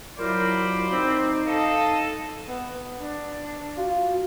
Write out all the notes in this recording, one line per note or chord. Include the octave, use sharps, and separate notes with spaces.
F#3 E4 F4 A#4 C5 D5 B5
C4 D#4
A4 D#5 F5
B3
D4
F4 F#4